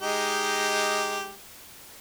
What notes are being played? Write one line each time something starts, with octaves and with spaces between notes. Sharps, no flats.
G#3 D#4 G4